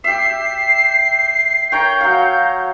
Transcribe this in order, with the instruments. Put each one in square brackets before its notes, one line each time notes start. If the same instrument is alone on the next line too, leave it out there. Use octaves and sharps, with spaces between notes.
[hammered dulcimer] G4 E5 [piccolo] C7
[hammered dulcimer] A#4 C#5 G5 [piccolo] G6
[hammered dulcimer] F#3 F5